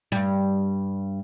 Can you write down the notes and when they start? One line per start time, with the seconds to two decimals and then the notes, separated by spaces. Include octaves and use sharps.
0.12 G2 G3